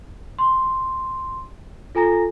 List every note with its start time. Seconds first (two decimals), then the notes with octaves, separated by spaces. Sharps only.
0.39 C6
1.95 F4 A4 G#5 A#5 A#6